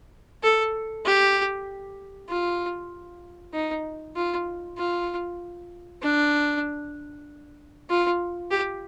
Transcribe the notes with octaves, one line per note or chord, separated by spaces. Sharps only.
A4
G4
F4
D#4
F4
F4
D4
F4
G4